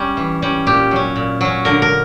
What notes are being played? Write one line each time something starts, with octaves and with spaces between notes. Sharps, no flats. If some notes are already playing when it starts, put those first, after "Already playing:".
Already playing: G3 C#4
E3
G3 C#4
A#2 G4
F#3 C#4
A#2
F#3 C#4
D3 A#4
A#4